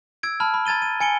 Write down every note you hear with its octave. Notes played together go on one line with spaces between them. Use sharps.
E6 G#6 D7
A5 B5 F6
B5
A#5 G#6 A6 D#7 G7
D#7
G#5 C#7 D7 G7